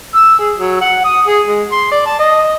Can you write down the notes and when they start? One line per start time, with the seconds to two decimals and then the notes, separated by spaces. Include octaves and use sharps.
0.15 E6
0.39 G#4
0.56 F#3
0.81 F#5
1.04 D#6
1.27 G#4
1.46 G#3
1.71 C6
1.91 D5
2.06 A5
2.19 D#5